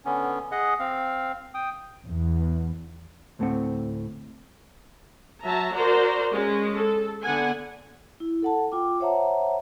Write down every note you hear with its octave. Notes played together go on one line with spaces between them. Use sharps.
D3 B3 C#4
G#4 D#5 F#5
C4 F5
G5 D#6
E2
D2 A2 A3 C4 F#5
F#3 E5 A5 A#5
F#4 A#4 C5 D5 A#5
G#3 C#4
A4
D3 B3 F#5 G#5
E4
A4 F#5 A5
F4 G5 D6
C5 C#5 E5 F#5 A5 A#5